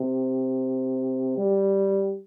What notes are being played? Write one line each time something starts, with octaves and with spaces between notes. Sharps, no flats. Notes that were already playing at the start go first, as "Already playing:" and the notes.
Already playing: C3
G3